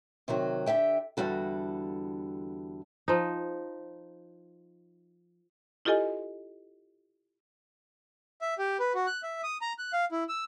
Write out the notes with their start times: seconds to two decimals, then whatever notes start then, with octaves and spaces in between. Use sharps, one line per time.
0.28 C3 D#3 F#3 F#4
0.66 D3 G4 E5 G5
1.17 E2 D3 G3 F#4 A4
3.08 F3 D#4
5.85 E4 F4 G4 A4 D#5 G#5
8.41 E5
8.59 G4
8.79 B4
8.95 F#4
9.07 F#6
9.23 E5
9.43 D#6
9.61 A#5
9.78 F#6
9.93 F5
10.12 E4
10.29 E6